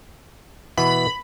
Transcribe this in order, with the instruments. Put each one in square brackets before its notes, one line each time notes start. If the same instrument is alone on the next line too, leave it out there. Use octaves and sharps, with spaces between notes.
[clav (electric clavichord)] B2 E3 B3 [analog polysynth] B5